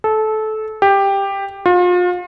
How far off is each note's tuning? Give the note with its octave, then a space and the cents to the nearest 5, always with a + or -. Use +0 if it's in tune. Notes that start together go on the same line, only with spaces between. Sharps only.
A4 -20
G4 +10
F4 +35